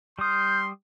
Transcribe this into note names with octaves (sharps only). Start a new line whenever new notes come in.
G3 C6 D#6 F6 G6